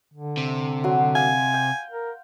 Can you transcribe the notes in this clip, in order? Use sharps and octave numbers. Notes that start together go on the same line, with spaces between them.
D3
C3
F#3 F#4 C6
F5 G#5
G5
A#4